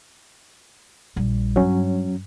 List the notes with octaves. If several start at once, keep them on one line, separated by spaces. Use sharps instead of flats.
A#1 G3
G2 F#3 C#4